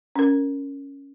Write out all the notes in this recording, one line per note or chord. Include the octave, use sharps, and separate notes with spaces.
C#4 A#4